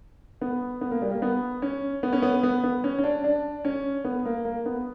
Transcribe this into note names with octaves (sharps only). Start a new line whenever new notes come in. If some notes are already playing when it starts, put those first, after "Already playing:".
B3
B3
A#3
G3
A#3
B3
C#4
B3
C#4
B3
B3
B3
C#4
C#4
D4
D4
C#4
B3
A#3
A#3
B3